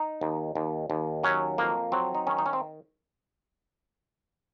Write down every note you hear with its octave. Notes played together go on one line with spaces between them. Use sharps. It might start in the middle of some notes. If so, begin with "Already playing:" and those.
Already playing: D#4
D#2
D#2
D#2
F#3 C#4
F2 A#3
F#3 C4
D#4
D#3 C#4
D#4
C#4
C4